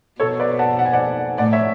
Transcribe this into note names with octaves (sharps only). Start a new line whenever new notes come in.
B2 A4 C#5
B4 D5
F#5 A5
F#5
G#5
D5 F#5
A2 D5 F#5
C#5 E5